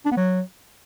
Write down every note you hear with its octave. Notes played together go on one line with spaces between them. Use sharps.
D4
B3
F#3